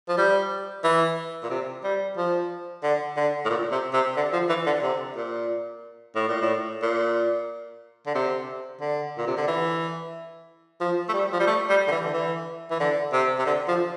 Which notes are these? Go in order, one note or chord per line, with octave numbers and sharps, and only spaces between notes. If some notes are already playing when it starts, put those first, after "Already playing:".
F3
G3
E3
A#2
C3
G3
F3
D3
D3
A2
A#2
C3
C3
D3
F3
E3
D3
C3
A#2
A2
A#2
A2
A#2
D3
C3
D3
A#2
C3
D3
E3
F3
A3
G3
F3
G3
A3
G3
D3
E3
D3
E3
E3
D3
C3
C3
D3
F3